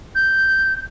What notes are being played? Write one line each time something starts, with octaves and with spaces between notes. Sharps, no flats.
G6